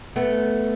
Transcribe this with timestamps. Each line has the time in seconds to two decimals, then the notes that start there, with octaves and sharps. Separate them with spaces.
0.16 A3 B3